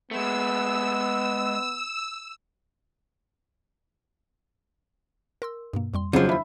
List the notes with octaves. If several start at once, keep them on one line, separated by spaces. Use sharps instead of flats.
G#3 A3 B3 E6
A#4 C6 E6
G2 B2 A#3
F2 G3 C6
D#2 C#3 F3 F#3
D4 E4 E5 B5